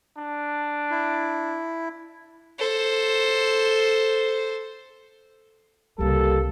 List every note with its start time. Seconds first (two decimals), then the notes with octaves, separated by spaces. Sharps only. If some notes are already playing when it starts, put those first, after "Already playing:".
0.18 D4
0.91 E4
2.59 A4 C5
5.99 C2 C#3 G3 A#3 A4